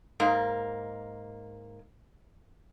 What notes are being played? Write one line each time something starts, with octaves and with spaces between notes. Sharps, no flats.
G#2 A#3